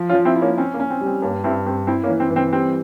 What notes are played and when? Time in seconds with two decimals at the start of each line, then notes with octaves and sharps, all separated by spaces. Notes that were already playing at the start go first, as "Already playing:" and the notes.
Already playing: F3
0.09 C#4 F4
0.15 F3
0.25 C4 E4
0.36 E4
0.41 A#3 C#4
0.58 C4 C#4
0.74 A#3
0.80 C#4
0.90 C4
1.01 G3
1.06 C4
1.22 G2 A#3 C#4
1.44 G2 C4 E4
1.66 G2 C4
1.87 C4 E4
2.04 A#3 C#4
2.09 E3
2.20 C4
2.30 E3
2.36 C4
2.52 G3 C4